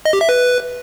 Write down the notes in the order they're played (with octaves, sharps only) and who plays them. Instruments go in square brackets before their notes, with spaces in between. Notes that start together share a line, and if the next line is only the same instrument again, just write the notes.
[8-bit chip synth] D#5
G4
E5
B4